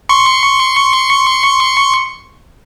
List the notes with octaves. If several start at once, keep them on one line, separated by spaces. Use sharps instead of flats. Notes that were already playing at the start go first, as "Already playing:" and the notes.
C6 C#6 C#7